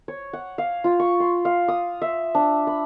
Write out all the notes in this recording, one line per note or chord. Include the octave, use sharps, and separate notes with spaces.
C#5
F#5
F5
F4
C#6
C6
F5
D#6
E5
D4
B5